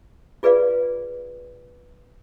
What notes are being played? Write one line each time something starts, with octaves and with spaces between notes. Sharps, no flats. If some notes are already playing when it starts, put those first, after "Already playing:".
F4 G#4 B4 D5 F5